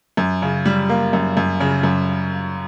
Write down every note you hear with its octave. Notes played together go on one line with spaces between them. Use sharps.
F#2
C#3
G3
A#3
F#2
F#2
C#3
F#2